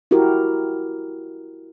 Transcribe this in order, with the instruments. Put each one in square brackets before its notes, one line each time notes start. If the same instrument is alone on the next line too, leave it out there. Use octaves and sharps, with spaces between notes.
[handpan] E4 F#4 G4 A#4